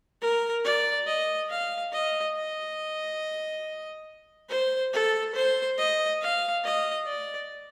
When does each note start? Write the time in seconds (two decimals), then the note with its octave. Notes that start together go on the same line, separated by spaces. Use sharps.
0.22 A#4
0.64 D5
1.07 D#5
1.50 F5
1.93 D#5
2.36 D#5
4.49 C5
4.93 A4
5.35 C5
5.78 D#5
6.21 F5
6.64 D#5
7.06 D5